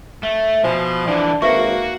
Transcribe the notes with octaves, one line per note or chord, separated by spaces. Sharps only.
A3
B2 F3 F4 C5 G#5
D3 E3 D4
G#1 A#3 F#4 B4 E5 C#6